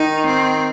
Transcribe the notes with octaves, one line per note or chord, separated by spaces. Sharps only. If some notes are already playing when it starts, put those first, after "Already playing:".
Already playing: D#3 D#4
C4